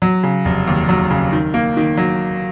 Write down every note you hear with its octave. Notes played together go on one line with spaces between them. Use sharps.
F#3
C#3
F1
D#2
F#3
C#3
D#3
A#3
D#3
F#3